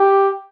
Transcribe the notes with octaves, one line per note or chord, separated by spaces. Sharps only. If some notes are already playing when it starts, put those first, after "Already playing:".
Already playing: G4